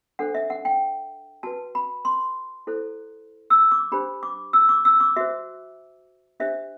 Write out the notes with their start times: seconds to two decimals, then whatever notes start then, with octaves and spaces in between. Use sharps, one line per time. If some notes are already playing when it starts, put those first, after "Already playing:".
0.19 D4 A4 C5 F#5
0.35 E5
0.50 F#5
0.65 G5
1.43 F#4 B4 A5
1.75 B5
2.05 C6
2.67 E4 A4 C5
3.50 E6
3.71 D6
3.92 D4 G4 C5 B5
4.23 D6
4.53 E6
4.69 D6
4.85 E6
5.00 D6
5.16 F#4 C5 E5
6.40 D4 G4 C5 E5